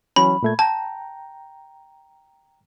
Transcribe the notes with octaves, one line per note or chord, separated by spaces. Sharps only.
E3 F#3 C#4 B5
A#2 A3 G#6
G5 A5 A#5